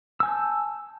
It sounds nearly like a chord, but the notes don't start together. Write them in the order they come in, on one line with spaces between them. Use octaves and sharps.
E6 G#5 G6 A5